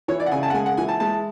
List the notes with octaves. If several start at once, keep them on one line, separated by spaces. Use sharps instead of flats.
E3 C#5
D5
F#5
C#3 G#5
A5
F#5
G#3 G#5
F#5
E3 G#5
A5
G#3 A5